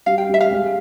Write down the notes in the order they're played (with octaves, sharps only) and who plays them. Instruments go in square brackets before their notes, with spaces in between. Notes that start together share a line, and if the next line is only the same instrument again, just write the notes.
[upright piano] G3 [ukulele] F5
[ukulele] G5
[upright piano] G3 [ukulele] E5
[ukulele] F5
[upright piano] G#3